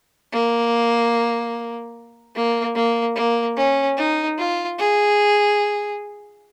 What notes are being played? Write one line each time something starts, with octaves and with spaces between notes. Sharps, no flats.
A#3
A#3
A#3
A#3
C#4
D#4
F4
G#4